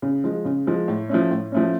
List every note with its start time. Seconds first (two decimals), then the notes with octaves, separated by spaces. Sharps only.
0.02 C#3
0.24 F3 G#3
0.45 C#3
0.67 F3 G#3
0.88 A2
1.09 F3 A3 C#4
1.31 A2
1.52 F3 A3 C#4